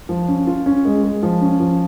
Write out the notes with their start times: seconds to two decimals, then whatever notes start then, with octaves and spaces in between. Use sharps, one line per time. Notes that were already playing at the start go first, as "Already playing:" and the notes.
0.09 F3
0.28 C#4
0.47 F4
0.66 C#4
0.85 G#3
1.04 G#3
1.23 F3
1.42 C#4
1.60 F3